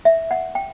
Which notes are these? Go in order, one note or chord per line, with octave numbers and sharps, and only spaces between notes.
E5
F#5
G5